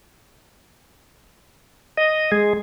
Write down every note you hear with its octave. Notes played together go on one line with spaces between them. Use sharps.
D#5
G#3 G#4